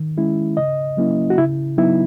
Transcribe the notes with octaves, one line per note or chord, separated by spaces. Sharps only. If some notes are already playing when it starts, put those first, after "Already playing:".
Already playing: D#3
G#3 C#4 E4
C#3 D#5
F#3 A#3 C#4 E4
F#4
C#3 E4
F#3 B3 D#4 E4